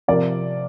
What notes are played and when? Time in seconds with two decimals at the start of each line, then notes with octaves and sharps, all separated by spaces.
0.08 C3 F3 A#4 D5